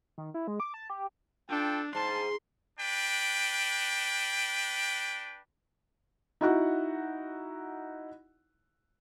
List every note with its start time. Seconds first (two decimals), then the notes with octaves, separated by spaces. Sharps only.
0.18 D#3
0.34 E4
0.47 G#3
0.60 D6
0.74 A5
0.90 G4
1.50 D4 F4 A4 G5
1.95 G#2 A5 C6
2.78 D4 B4 G5
6.41 D#4 E4 F#4 F#5